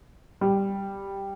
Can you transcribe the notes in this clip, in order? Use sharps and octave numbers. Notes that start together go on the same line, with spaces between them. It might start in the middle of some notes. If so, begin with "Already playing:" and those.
G3